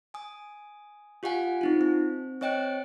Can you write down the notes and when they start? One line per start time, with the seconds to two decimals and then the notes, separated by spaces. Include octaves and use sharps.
0.14 G#5 D#6
1.23 F4 G4 F5 F#5 G#5
1.61 C4 D#4 F4
1.81 C4
2.41 C4 C#5 D#5 G5 F#6 D7